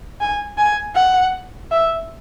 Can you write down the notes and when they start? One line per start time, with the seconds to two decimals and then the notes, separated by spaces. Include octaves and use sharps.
0.21 G#5
0.58 G#5
0.95 F#5
1.71 E5